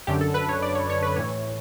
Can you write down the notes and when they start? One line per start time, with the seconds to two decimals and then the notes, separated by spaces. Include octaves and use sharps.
0.07 F#2 D3 G4
0.21 A4
0.34 B4
0.49 C#5
0.62 D5
0.75 C#5
0.90 C#5
1.03 B4
1.16 A2 E3 C#5